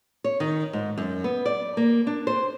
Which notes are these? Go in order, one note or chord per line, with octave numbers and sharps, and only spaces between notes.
C#5
D#3
G#2
F#2
B3
D5
A#3
D4
C5